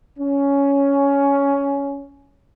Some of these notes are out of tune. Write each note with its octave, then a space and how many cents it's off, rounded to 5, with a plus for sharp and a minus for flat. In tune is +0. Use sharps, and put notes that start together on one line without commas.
C#4 +10